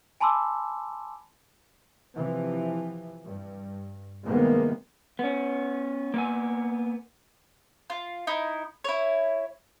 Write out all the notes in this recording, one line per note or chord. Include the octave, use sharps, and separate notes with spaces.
G#5 A5 B5 C6 D6 E6
C3 E3 F3
G2
C3 D#3 G3 G#3 A#3 B3
B3 C#4
A#3 B3 G#5
F4
D#4 E4
E4 C#5